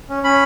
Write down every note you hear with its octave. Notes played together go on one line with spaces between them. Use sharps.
C#4
C#4 B5